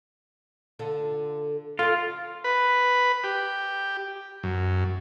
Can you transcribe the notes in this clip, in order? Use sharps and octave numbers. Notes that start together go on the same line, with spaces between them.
D3 F4 A4
F4 A4 D5
B4
G4
F#2